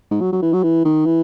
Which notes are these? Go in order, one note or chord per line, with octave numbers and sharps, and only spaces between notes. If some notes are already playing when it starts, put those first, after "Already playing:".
G#2
F#3
F#3
E3
F#3
E3
D#3
E3